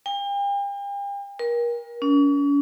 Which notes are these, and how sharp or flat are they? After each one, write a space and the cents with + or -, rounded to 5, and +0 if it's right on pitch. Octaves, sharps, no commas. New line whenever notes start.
G5 +40
A#4 +30
C#4 +40